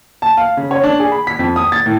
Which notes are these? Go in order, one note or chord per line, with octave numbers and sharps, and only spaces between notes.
A5
F5
C#3
C#5
D4
G#4
B5
B6
F2
D#6
A6
A2